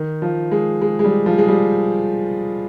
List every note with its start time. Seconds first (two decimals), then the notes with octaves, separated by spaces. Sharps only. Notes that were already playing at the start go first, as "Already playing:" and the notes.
Already playing: D#3
0.22 F3
0.51 G#3
0.81 G#3
0.99 G#3
1.04 G3
1.26 F3
1.38 G#3
1.48 G3